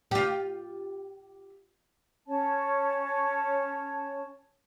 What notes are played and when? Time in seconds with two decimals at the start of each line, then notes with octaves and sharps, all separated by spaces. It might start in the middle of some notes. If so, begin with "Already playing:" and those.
0.11 F4 G4
2.28 C#4 C#5 A5